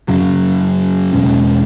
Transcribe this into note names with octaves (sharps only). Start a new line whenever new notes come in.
F#2 C#3 F#3
E2 B2 G#3 C#4